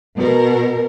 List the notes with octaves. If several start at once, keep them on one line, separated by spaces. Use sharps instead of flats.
B2 A#4